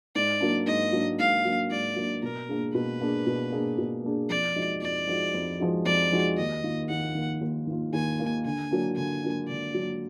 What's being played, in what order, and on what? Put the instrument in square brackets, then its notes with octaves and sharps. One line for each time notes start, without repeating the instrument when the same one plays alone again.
[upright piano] G#2 [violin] D5
[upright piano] F#3 A#3 D4
[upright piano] G#2 [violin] D#5
[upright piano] F#3 A#3 D4
[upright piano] G#2 [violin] F5
[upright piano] F#3 A#3 D4
[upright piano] G#2 [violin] D5
[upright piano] F#3 A#3 D4
[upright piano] B2 [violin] A#4
[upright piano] A#3 D4 G#4
[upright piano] B2 [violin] B4
[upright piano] A#3 D4 G#4
B2
A#3 D4 G#4
B2
A#3 D4 G#4
[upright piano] F2 [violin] D5
[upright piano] F3 G#3 D#4 F#4
[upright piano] F2 [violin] D5
[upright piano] F3 G#3 D#4 F#4
F2
F3 G#3 D#4 F#4
[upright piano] F2 [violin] D5
[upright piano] F3 G#3 D#4 F#4
[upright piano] D#2 [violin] D#5
[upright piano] D#3 A#3 F4
[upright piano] D#2 [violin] F#5
[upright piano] D#3 A#3 F4
D#2
D#3 A#3 F4
[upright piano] D#2 [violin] G#5
[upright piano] D#3 A#3 F4
[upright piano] D3 [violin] G#5
[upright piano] F#3 A#3 D4
[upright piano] D3 [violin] G#5
[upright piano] F#3 A#3 D4
[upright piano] D3 [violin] D5
[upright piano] F#3 A#3 D4